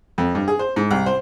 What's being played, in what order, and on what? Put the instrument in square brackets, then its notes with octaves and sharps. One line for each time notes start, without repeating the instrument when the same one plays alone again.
[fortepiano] F2
G2
G#4
C5
G#2
C2
C5